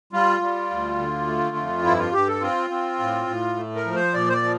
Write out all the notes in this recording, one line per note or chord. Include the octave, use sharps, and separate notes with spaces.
G3 F4
G3
D2
D3
A3
F2
G2 E4
F4
G2 G4
A4
C4 F4
C4
A2
A2
A3
A#4
F3
C5
A#2 D5
C5
D5
F3